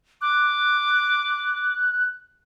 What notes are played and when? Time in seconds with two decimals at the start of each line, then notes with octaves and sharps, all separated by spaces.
0.21 D6 F#6